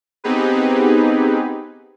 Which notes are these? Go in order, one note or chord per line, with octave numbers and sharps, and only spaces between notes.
B3 C4 D#4 G4 G#4 B4